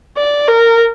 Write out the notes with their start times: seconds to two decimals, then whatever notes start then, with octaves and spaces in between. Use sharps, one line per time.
0.17 D5
0.48 A#4